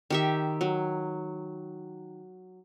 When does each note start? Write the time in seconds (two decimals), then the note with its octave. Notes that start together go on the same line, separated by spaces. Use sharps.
0.10 D#3 G4 E5
0.61 F#3